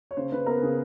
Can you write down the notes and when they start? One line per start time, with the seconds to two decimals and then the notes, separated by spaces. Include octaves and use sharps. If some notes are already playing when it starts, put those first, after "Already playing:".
0.11 C#5
0.17 C#3 C5
0.32 C#3 B4
0.46 B3 A#4
0.62 C#3 G#4